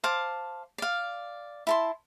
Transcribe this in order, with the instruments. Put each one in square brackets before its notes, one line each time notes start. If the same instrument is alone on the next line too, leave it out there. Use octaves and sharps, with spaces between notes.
[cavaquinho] C5 F5 A5 D6
D5 F5
E4 A5 C6